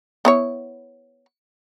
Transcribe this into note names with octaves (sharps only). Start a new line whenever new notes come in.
B3 E4 C#5